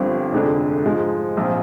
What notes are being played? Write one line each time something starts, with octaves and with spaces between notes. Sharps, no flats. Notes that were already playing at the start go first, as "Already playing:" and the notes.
Already playing: G1 G2 F3 C4
F1 F2 D3 G#3 D4
G#2 F3 G#3
A#1 G#2 F3 C4 F4